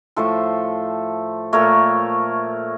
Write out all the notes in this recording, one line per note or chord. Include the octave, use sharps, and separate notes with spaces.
A2 F3 A3 A4 C5
A#2 A3 A#4 C#5